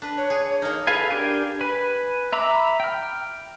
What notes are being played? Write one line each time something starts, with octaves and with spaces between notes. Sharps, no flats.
D4 B4
C#5
G#4
A#3 D#4 F6
G#4 A4 B4 F5 G#5
D4 G4 A#4 G5 G#5
B4 G#5 B5
E5 A#5 B5 D6 E6
G5 F6